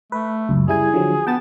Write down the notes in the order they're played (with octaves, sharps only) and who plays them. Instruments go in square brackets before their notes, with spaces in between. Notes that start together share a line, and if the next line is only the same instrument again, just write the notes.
[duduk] A3 [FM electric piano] B4
[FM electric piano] C#2 F#2
[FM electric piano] G3 E4 G#5 [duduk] G#4
[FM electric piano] D3 F3 F#3
[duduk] B3 [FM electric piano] G5 A5 A6